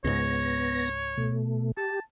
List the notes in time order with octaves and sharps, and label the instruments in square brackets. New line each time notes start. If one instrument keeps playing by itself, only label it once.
[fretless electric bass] C#2 G#2 [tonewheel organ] B3 A#6 [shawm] C#5
[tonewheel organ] B2 A3
[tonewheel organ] G4 [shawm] A5